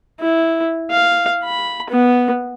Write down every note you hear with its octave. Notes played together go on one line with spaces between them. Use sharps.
E4
F5
B5
B3